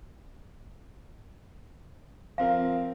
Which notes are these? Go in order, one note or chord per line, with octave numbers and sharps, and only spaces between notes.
F3 C4 A#4 F5